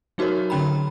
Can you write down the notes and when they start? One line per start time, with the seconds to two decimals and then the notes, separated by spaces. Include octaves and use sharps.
0.18 F#3 D#4 F#4 G4 A#4 C#5
0.50 D3 C#4 G5 A#5 B5